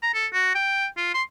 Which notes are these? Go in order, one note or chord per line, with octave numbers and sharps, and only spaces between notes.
A#5
A4
F#4
G5
F4
C6